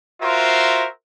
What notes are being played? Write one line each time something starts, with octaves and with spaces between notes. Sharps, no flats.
F4 F#4 A#4 C5 E5